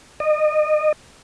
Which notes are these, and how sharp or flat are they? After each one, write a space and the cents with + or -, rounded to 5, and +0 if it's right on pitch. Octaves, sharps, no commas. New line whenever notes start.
D#5 -30